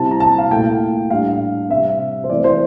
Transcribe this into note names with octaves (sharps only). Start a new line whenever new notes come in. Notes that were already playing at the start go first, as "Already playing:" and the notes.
Already playing: C3 G3 C4 E4 A5
A#5
A5
F5
A#2 A3 E4 G5
A2 G3 D4 F5
C3 G3 C4 E5
C5
E3 A3 C4 E4 D5
C5